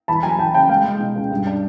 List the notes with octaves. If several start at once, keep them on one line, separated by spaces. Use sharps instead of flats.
E2 A5 B5
F#3 G#5 A#5
E2 G5 A5
C#3 G5 A5
G#3 F5 G5
G#3
B2
C#2
G2
D4